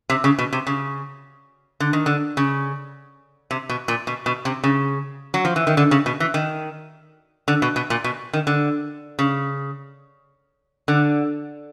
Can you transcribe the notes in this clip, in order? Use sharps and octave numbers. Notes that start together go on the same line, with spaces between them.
C3
C#3
B2
C3
C#3
D3
D#3
D3
C#3
C3
B2
A#2
B2
B2
C3
C#3
F#3
F3
E3
D#3
D3
C#3
B2
E3
D#3
D3
B2
B2
A#2
B2
D#3
D3
C#3
D3